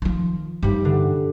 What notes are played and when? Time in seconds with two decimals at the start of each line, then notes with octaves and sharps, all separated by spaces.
0.02 D#3 F3
0.63 G2 G3 D#4
0.85 D3